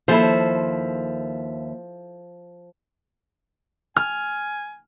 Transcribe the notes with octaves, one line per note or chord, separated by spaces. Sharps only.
D#2 F3 E4 A4 C5 E5
G#5 F6